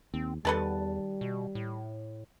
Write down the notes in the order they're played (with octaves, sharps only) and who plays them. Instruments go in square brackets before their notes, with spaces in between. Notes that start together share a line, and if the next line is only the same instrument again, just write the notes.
[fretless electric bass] D#2 [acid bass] C4
[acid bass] E2 [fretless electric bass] D#3 [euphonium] G3 [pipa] A4 B4 A5
[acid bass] B2
A2